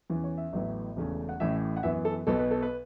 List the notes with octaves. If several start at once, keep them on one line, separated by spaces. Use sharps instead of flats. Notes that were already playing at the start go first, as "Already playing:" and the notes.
E2 E3 C#4
C#5
E5
A1 A2 F#3 B3
E1 E2 C#3 A3 C#4
F#5
A1 A2 E3 C#4 E5
F#5
F#2 E3 B3 E5
A4
B1 B2 B3 A4
B4
A4
B4